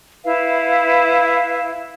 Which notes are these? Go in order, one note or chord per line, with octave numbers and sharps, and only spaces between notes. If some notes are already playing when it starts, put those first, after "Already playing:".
E4 B4 F5